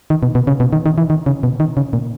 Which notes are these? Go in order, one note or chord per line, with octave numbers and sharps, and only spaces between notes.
D#3
B2
B2
C#3
B2
D#3
D#3
E3
D#3
C#3
B2
D#3
C#3
A#2